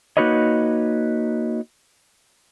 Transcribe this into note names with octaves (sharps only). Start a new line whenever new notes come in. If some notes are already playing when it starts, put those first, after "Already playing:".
A#3 D#4 F#4 B4 C#5 D#5